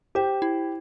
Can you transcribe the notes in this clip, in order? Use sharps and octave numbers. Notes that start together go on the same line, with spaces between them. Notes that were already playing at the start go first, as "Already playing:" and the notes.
G4 C5
E4